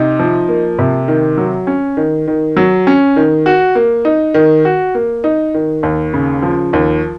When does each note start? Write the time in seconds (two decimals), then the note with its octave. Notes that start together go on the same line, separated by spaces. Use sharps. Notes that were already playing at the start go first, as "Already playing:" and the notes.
Already playing: C3 D#4
0.19 F3
0.49 A#3
0.79 C3
1.08 D#3
1.38 F#3
1.67 C#4
1.97 D#3
2.27 D#3
2.57 F#3
2.87 C#4
3.16 D#3
3.46 F#4
3.75 A#3
4.05 D#4
4.34 D#3
4.65 F#4
4.95 A#3
5.24 D#4
5.54 D#3
5.83 D#2
6.13 C#3
6.42 F3
6.73 D#2